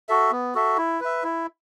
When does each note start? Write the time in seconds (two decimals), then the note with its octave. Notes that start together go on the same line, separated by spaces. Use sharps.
0.09 F#4 A4 E5
0.31 B3
0.55 F#4 A4 E5
0.77 E4
1.00 B4 E5
1.24 E4